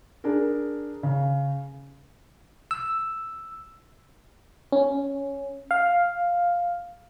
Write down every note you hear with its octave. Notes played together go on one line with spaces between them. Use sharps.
D4 G#4 A#4
C#3
E6
C#4
F5